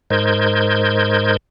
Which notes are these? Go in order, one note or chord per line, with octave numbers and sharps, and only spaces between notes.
G#2 A#4 C5 D#5 G6 G#6